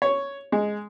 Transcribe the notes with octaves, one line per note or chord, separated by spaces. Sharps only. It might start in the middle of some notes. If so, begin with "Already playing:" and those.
C#5
G#3